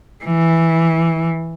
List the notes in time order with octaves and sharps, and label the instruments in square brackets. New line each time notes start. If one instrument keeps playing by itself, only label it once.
[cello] E3